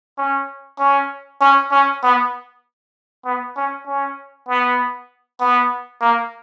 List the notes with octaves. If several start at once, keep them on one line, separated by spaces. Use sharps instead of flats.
C#4
C#4
C#4
C#4
B3
B3
C#4
C#4
B3
B3
A#3